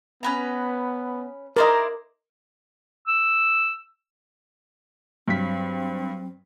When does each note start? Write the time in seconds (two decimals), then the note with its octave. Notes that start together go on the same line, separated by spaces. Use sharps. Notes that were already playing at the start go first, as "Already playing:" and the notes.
0.23 B3 C#4 B4 A#5
1.56 E4 A#4 C5 D5 D#5 A#5
3.07 E6
5.28 G2 F#3 C4 B6